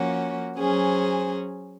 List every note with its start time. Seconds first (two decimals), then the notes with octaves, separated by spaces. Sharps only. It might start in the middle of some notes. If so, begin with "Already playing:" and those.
Already playing: F3 A#3 C#4 F#4
0.57 F#3 C#4 G#4 C5